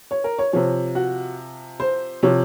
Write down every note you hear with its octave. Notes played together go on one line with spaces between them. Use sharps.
C#5
A#4
C#5
C3 F3 C#5
F#4
C5
C3 F3 C#5